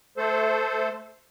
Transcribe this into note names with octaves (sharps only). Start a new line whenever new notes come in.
A3 A4 C5